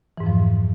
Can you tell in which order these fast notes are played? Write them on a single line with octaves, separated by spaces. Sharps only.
E3 G#2 F2 F3